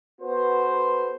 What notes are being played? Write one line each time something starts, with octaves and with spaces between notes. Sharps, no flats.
B3 F#4 A4 B4 C5